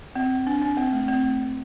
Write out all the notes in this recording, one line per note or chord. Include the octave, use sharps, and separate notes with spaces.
C4
D4
D4
C4
A3
C4